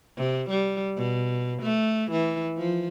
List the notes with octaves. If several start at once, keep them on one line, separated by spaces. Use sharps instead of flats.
C3
G3
B2
A3
E3
F3